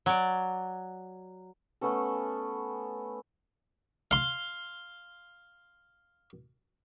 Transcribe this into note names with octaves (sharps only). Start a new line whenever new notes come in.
F#3 D5
A3 B3 C#4 A4
F5 C6